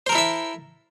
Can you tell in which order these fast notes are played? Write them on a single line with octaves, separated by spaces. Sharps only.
C5 A#4 A4 E4 E5